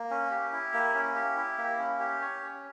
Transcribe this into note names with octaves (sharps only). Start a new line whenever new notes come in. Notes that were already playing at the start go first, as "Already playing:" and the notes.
Already playing: A#3
C#4
G4
E4
A#3
C#4
G4
E4
A#3
C#4
G4
C#5
C#4